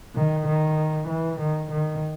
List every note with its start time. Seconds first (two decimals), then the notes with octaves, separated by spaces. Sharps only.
0.15 D#3
0.47 D#3
1.08 E3
1.40 D#3
1.71 D#3